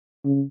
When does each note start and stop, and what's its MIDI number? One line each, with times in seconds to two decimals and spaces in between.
0.25 0.42 49